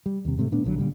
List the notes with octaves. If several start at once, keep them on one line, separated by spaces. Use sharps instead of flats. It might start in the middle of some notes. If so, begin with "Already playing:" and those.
G3
D#2 C3
G#2 C3 F#3 A3
A#2 A3 B3 D4
A#1 D3 D#3 F#3
A#2 D3 G3